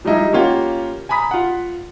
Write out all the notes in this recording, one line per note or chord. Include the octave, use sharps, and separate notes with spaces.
F3 G3 G#3 D#4 E4
A#3 C#4 F4 G4 F#5
G#5 A#5 B5 D#6 B6
F4 F#5